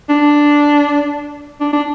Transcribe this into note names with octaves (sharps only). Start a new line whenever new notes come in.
D4
D4
D4